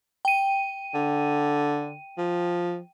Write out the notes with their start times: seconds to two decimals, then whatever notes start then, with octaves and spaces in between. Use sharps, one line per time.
0.25 G5 D#7
0.94 D3
2.17 F3